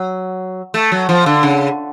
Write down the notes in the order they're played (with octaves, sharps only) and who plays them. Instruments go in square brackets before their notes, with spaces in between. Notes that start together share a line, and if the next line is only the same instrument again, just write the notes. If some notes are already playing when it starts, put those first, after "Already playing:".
Already playing: [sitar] F#3
A3
F#3
F3
D3
C#3